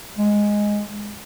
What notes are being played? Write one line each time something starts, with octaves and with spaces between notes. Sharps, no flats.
G#3